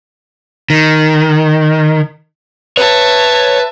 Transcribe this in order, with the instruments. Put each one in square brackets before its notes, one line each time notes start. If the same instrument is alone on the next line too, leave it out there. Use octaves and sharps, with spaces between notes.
[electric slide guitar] D#3
[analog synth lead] B4 [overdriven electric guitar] C#5 [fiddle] E5 A5